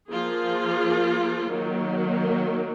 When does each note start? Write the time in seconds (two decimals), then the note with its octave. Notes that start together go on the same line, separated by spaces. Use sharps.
0.12 F3 A#3 F4 G#4
1.52 D#3 F#3 A#3